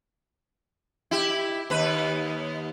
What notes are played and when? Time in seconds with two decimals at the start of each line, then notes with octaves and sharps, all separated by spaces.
1.11 E4 G4
1.70 D#2 B4